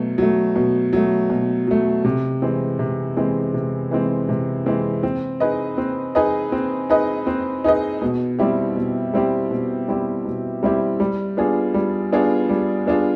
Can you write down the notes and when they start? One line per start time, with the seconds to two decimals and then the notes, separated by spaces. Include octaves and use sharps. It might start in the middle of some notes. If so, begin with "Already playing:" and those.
Already playing: B2 F#3 A3
0.18 F#3 A3
0.56 B2
0.93 F#3 A3
1.30 B2
1.67 F#3 A3
2.05 C3
2.42 E3 G#3 C4
2.79 C3
3.16 E3 G#3 C4
3.54 C3
3.91 E3 G#3 C4
4.29 C3
4.66 E3 G#3 C4
5.03 C4
5.40 D#4 G#4 B4 D#5
5.78 C4
6.15 D#4 G#4 B4 D#5
6.52 C4
6.90 D#4 G#4 B4 D#5
7.27 C4
7.64 D#4 G#4 B4 D#5
8.02 B2
8.39 G3 C4 E4 G4
8.76 B2
9.14 G3 C4 E4 G4
9.51 B2
9.88 G3 C4 E4 G4
10.25 B2
10.63 G3 C4 E4 G4
11.00 G3
11.37 B3 D4 F4 G#4
11.74 G3
12.12 B3 D4 F4 G#4
12.49 G3
12.87 B3 D4 F4 G#4